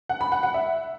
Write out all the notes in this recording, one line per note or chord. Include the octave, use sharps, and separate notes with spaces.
F#5
B5
F#5
F#5
E5